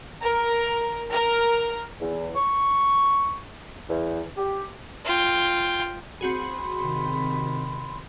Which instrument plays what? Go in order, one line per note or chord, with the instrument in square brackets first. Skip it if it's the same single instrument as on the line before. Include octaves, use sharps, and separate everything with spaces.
[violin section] A#4
A#4
[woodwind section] E2
C#6
E2
G4
[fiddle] F4 G5
[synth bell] C4 F#4 G#4 [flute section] B5 C6
[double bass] C3 D#3